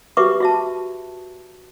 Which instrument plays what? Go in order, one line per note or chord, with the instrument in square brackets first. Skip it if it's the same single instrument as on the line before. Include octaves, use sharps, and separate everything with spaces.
[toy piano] F#4 G4 B4 E5 C#6 D6
F#4 E5 A5